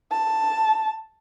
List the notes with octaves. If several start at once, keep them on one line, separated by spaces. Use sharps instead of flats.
A5